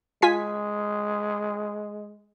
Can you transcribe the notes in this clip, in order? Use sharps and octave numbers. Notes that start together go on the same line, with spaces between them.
G#3 F4 G#5 B6